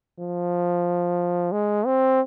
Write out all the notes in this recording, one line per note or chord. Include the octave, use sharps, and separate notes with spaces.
F3
G#3
C4